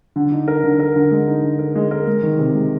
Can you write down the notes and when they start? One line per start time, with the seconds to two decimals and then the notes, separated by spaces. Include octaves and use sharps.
0.16 D3
0.32 D#4
0.48 A#4
0.64 D3
0.80 A#4
0.96 D3
1.11 G#3
1.28 D#4
1.43 D3
1.59 A#4
1.76 G#3
1.91 A#4
2.07 G#3
2.23 D#3
2.39 C3
2.55 G#3